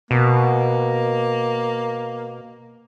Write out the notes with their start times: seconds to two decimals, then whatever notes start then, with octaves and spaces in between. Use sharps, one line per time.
0.11 B2 A#3